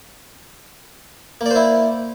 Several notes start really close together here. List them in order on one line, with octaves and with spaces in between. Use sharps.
A#3 D5 C5 E4